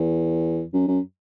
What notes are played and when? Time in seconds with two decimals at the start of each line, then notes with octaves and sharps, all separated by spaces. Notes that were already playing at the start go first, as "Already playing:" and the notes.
Already playing: E2
0.73 F#2
0.88 F#2